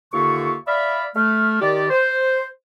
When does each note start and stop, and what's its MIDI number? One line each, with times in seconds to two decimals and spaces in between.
0.12 0.55 39
0.12 0.55 50
0.12 0.55 58
0.12 0.55 65
0.12 0.55 76
0.12 0.55 85
0.67 1.05 74
0.67 1.05 76
0.67 1.05 77
0.67 1.05 83
1.15 1.57 57
1.15 1.57 89
1.60 1.89 51
1.60 1.89 67
1.60 1.89 74
1.90 2.44 72